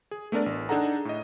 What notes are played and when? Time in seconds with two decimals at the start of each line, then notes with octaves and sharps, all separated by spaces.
0.11 G#4
0.32 A3 B3 D4 A#4 D5
0.46 A1
0.69 D4 D#4 G#4 A4 F#5 A#5
1.05 A2 D#5